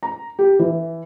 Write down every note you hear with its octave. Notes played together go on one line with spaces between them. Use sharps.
A#5
G4
E3